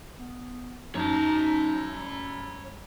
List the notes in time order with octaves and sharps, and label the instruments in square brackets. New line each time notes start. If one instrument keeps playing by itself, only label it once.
[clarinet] B3
[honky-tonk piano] F#2 [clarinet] D#4 [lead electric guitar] C#5 A5
[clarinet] G3